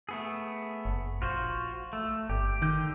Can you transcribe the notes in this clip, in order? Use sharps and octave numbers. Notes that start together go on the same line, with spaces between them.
A3 B3 G#4
F#1
A#1 F4 F#4 C5
A3
G1 G4
D3 D#3 G6